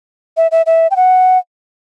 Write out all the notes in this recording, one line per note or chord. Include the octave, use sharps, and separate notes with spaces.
E5
E5
E5
G5
F#5